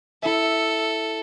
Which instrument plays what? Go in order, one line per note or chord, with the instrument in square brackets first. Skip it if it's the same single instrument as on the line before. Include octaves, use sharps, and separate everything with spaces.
[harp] E4 E5 [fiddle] A4